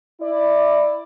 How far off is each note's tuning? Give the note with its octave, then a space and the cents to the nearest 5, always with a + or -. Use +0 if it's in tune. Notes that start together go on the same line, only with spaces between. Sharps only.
E4 +0 D5 +15